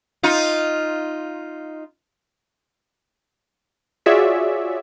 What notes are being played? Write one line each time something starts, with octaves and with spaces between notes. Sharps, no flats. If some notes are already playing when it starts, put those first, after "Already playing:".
D#4 F4
F4 F#4 G#4 C#5 D5 E5